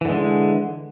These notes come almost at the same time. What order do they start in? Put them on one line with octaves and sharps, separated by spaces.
E3 D3 G#3